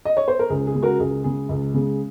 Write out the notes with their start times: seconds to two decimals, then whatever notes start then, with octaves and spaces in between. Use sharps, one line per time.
0.05 D#5
0.17 C#5
0.28 C5
0.39 A#4
0.49 C#2 G#4
0.67 G#4
0.75 C#3 G#3
0.82 F#4 A#4
0.99 C#2 G#4
1.24 C#3 G#3 G#4
1.49 C#2
1.74 C#3 G#3